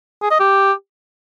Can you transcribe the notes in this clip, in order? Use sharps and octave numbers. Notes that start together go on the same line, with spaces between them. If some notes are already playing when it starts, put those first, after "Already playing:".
G#4
D#5
G4